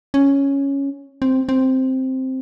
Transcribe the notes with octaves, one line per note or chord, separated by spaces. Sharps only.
C#4
C4
C4